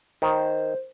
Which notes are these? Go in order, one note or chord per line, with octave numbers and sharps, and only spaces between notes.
D#3 C5